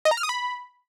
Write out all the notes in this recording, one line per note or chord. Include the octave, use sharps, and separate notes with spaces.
D#5
A#5
F6
D#6
B5